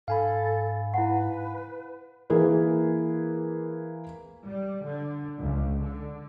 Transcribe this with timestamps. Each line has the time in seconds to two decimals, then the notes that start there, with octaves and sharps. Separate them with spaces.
0.08 G#2 A4 F5 G#5 B5
0.94 E4 B4 F#5
2.30 E3 A#3 G#4 A#4 B4
4.46 G3
4.83 D3
5.39 C#2
5.81 D3